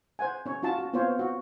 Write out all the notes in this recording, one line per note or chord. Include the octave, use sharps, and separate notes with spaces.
C5 F#5 G#5
C#4 C#5
C#4 F4 F#4 A5
F#4
B3 C4 F4 C5 C#5
F#4